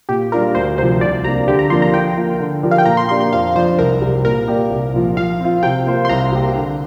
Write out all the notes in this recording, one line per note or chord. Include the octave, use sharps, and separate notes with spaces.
A#2 G4
G3 D4 F4 A#4
D2 C5
C3 F3 C5
C2 D5
C3 A#3 D4 A#5
D3 G4
A#5
F3 A#3 D4 C6
A#5
F3 G5
A#3 F4
D3
F3 D4 G4 A#4
F5
G5
A#2 A#5
C6
A#3 D4 G4 C6
C6
F2 F5
F3 D4 C5
C2 A#4
C3 G3
A#2 A#4
A#3 G4 D5
C2
A#2 F3
F3 F5
C4 F4
C3 G5
A#3 F4 C5
C6
C2 A#5
C3 A#3 G4
D3